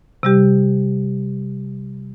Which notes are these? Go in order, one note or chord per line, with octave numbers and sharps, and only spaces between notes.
C3 G3 G4